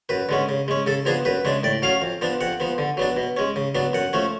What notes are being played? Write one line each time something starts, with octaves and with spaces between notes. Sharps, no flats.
F#2 B4
D3 G#3 C#4
C#3
G#3 C#4
C#3 A4
F3 B3 D4 G#4
F#2 B4
C#3 G#3 D4
A2 D5
F#3 C#4 F5
F2
F3 B3 D4
F2 F#5
F3 B3
D3
F#3 B3 D4
B2
G#3 C#4
C#3
F#3 B3 D4
F#2 F#5
F3 A3 C#4